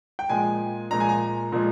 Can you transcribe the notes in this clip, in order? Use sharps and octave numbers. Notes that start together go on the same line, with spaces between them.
G5
A#2 F3 G#3 G#5
A#2 F3 G#3 A#5
G#5
A#5
A#2 F3 G#3